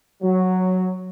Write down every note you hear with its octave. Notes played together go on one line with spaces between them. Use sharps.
F#3